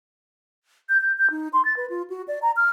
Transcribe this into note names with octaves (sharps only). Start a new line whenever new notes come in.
G6
G6
G6
D#4
C6
A6
B4
F4
F#4
D5
A#5
F6